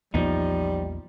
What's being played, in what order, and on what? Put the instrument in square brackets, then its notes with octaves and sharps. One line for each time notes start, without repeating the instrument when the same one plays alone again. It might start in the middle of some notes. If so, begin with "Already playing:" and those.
[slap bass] A#1 E2 B3 [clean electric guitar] F3 D#4 [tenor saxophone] G3